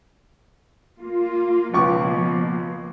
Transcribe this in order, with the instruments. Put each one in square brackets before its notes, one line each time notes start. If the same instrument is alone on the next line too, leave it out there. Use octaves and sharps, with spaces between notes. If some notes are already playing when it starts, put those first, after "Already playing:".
[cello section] A#3 F4
[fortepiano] C#2 C#6 D6 [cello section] B2 F3 A#3